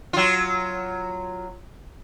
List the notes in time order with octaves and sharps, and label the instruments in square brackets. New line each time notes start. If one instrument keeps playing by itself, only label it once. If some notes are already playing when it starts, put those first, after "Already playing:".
[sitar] F#3 F4